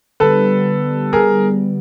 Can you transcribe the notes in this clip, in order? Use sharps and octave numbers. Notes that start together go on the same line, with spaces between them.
D3 G3 B3 A4 B4
G#4 A#4